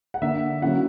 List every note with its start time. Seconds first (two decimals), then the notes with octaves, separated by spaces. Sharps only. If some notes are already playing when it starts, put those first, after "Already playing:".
0.14 F#5
0.22 D3 A#3 D4 E5
0.62 D3 F#3 A#3 C#4 E4 F#5